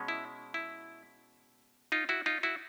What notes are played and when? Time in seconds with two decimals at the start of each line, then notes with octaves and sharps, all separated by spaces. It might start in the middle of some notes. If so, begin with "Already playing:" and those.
Already playing: B2 G#3 C#4
0.08 E4
0.54 E4
1.92 D#4 F4
2.09 E4 F#4
2.26 D#4 F4
2.43 E4 F#4